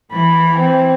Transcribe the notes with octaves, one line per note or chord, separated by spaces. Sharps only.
E3 B5
C4